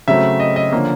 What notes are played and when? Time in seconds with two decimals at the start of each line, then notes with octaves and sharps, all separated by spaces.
0.08 C#3 F#3 A3 C4 E5
0.40 D#5
0.56 D#5
0.72 D3 F3 A#3 C#4